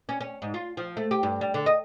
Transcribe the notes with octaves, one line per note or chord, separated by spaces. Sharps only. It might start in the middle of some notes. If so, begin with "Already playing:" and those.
C#4
C#4
G#2
F4
F3
A3
G4
G2
G3
D3
D#5